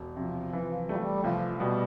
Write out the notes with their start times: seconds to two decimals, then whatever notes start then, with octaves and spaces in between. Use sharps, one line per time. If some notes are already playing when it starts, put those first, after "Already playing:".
Already playing: E1
0.16 C3 F3
0.53 E3
0.88 G3 A3
0.96 F3
1.02 G3
1.24 C2 F3
1.60 B2 G3